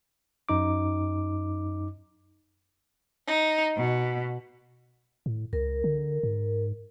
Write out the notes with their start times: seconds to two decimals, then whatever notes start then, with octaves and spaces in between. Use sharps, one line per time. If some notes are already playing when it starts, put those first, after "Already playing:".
0.49 F#2 D#4 D6
3.28 D#4
3.77 B2
5.26 A2
5.53 C#2 A#4
5.84 D3
6.23 G#2